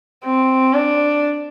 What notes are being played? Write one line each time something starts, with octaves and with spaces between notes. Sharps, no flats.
C4
D4